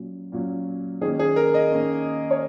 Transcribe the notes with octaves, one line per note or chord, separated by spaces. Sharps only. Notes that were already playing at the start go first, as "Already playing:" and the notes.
Already playing: A#2 F#3 C#4
A#2 F#3 C#4
D#3 A#3 C#4 G#4
G#4
A#4
D#5
D#3 A#3 C#4
C#5